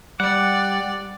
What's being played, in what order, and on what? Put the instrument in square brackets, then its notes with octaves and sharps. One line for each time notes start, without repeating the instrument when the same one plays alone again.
[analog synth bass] G3 [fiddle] D5 [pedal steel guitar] F#5